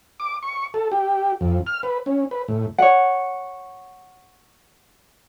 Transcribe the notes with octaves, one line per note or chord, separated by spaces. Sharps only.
D6
C#6
A4
G4
F2
F6
B4
C#4
B4
A2
C#5 F#5